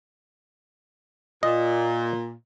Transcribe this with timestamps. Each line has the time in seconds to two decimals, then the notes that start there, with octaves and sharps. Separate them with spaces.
1.43 A#2 D#5